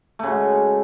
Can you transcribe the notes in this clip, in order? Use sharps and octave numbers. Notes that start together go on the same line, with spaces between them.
C#3 G#3 A3 F#4